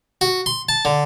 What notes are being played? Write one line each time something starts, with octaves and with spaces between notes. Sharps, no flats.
F#4
C6
A5
D3